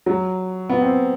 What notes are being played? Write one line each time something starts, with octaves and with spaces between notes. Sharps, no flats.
F#3
B3
C4